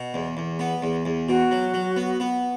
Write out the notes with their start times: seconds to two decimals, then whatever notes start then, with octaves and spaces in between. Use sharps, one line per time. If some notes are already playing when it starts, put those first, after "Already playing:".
Already playing: B2
0.14 E2
0.37 E2
0.59 B3
0.82 E2
1.06 E2
1.28 B2 F#4
1.51 F#3
1.74 F#3
1.96 B3
2.20 B3